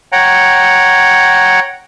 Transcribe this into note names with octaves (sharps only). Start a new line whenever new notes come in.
C#5 F#5 G5 A#5